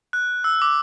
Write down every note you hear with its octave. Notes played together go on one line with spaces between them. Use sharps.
F#6
E6
D6